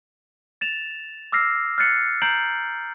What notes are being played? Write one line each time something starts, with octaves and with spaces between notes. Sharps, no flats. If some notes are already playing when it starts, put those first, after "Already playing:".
A6 E7 F7
D6 E6 F6 A#6 C7
F6 F#6 G#6 A6 C7 C#7
A#5 G6 C7 D7 F#7